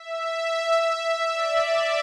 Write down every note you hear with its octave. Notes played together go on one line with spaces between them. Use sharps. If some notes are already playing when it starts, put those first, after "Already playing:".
Already playing: E5
E5
D5